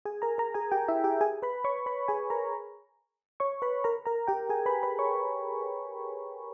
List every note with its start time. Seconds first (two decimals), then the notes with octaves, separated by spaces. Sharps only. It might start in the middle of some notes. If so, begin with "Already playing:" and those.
0.05 G#4 G#5
0.22 A#4 A#5
0.38 A#4 A#5
0.54 G#4 G#5
0.72 G4 G5
0.88 E4 E5
1.04 G4 G5
1.21 G#4 G#5
1.43 B4 B5
1.64 C#5 C#6
1.86 B4 B5
2.08 G#4 G#5
2.30 A#4 A#5
3.40 C#5 C#6
3.62 B4 B5
3.84 A#4 A#5
4.06 A#4 A#5
4.27 G4 G5
4.49 G#4 G#5
4.66 B4 B5
4.83 B4 B5
4.99 C#5 C#6